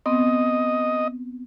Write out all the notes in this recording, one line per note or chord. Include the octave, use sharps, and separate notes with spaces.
B3 C4 D#5